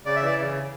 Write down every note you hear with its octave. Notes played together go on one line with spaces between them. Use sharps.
C#3 D5
E5
E3 D5
C#3